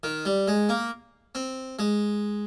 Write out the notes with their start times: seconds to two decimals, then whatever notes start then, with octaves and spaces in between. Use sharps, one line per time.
0.03 D#3
0.25 G3
0.48 G#3
0.69 A#3
1.35 C4
1.79 G#3